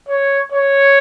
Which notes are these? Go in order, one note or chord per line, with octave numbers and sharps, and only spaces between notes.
C#5
C#5